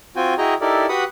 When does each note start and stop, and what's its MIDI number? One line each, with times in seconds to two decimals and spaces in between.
0.16 0.34 60
0.16 0.34 65
0.16 0.34 66
0.16 0.34 79
0.16 0.34 80
0.38 0.54 64
0.38 0.54 66
0.38 0.54 68
0.38 0.54 75
0.38 0.54 79
0.38 0.54 82
0.61 0.86 63
0.61 0.86 64
0.61 0.86 67
0.61 0.86 69
0.61 0.86 70
0.61 0.86 74
0.89 1.04 66
0.89 1.04 67
0.89 1.04 71
0.89 1.04 78
0.89 1.04 83
0.89 1.04 87